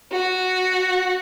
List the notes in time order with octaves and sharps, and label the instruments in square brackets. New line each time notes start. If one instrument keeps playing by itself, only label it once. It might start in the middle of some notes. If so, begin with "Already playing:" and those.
[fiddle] F#4